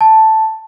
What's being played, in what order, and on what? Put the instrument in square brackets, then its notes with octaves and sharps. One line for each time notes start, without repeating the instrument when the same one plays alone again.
[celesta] A5